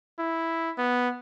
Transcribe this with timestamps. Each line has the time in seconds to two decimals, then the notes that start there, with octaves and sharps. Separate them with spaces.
0.19 E4
0.78 B3